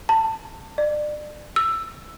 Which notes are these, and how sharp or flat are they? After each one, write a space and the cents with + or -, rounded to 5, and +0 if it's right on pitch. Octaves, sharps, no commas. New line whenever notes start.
A5 +25
D5 +30
E6 +10